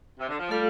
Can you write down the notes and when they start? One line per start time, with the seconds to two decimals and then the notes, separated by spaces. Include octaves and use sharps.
0.19 C3
0.29 D3
0.39 F3
0.49 G3 A3 F4 A4 F5